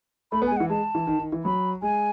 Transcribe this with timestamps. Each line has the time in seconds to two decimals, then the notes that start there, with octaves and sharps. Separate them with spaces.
0.32 A3 B5
0.42 B3
0.47 G#3 G#5
0.57 E3 F#5
0.70 G#3 A5
0.95 E3
1.07 D#3
1.19 D#3
1.32 E3
1.45 F#3 B5
1.82 G#3 G#5